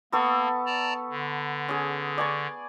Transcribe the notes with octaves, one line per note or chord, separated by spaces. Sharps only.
A#3 B3 A4 C#6
D5 A5 A#5
D3
C#4 G#4
D5 G#5 C#6